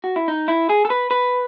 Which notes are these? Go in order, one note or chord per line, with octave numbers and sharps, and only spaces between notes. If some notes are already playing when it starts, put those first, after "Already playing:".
F#4
E4
D#4
E4
G#4
A4
B4
B4